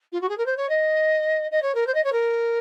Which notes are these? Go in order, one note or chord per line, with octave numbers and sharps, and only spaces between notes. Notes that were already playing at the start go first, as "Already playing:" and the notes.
F4
F#4
G#4
A#4
C5
C#5
D#5
D#5
C#5
A#4
C5
D#5
C#5
A#4